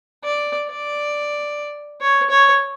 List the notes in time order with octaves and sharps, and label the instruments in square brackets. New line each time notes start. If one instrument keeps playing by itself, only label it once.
[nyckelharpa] D5
D5
C#5
C#5